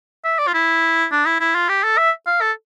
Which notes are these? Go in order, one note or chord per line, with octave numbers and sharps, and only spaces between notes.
E5
D5
F4
E4
D4
E4
E4
F4
G4
A4
E5
F5
A4